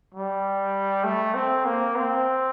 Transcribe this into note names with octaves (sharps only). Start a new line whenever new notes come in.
G3
A3
C4
A#3
C4